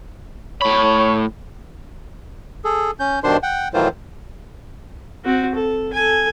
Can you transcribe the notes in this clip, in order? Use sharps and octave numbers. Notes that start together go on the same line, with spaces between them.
A2 C#5 B5
G#4 A4
C#4 G6
G2 B2 D#3 D4 C5 C6
F#5 G5
A2 D#3 E3 F#3 F4 C5
C4 F#4
A4
A4 G#5